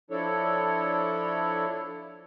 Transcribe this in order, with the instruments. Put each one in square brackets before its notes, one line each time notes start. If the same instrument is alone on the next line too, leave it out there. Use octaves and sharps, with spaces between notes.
[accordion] F3 D4 E4 A4 C#5